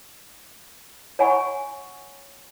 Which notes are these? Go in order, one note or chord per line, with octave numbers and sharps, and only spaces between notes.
C#5 F#5 G#5 B5 C#6